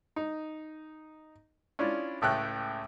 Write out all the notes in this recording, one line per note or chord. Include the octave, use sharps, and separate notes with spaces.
D#4
C#4 D4 E4 F4
C#2 A2 A3 G5 F#6